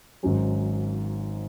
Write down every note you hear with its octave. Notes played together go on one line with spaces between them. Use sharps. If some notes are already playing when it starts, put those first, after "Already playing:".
G#1 G#2 F#3 C#4